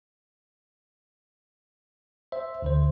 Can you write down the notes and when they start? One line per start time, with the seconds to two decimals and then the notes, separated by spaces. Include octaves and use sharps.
2.32 C5 E5
2.62 D2 D3 C5